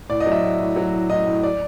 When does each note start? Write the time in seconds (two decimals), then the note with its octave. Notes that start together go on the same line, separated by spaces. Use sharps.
0.09 A2 D5
0.20 D#5
0.26 F#3
0.32 E5
0.43 A2
0.60 A2
0.76 F#3
0.93 A2
1.10 A2 D#5
1.27 A2
1.43 D5